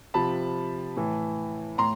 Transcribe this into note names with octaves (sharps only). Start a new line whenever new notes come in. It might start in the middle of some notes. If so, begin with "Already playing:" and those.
C3 F3 A5 B5
A2 E3
A2 A#5 C6